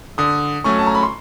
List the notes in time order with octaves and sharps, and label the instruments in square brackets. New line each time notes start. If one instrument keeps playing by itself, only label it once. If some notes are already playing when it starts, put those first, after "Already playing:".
[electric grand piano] D3 [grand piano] D#6
[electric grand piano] F#3 A3 C#4 [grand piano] C#6
[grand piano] A5
A#5
B5
C6